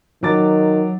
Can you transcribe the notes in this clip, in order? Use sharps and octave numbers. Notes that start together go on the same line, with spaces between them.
D#3 F#3 D6 A6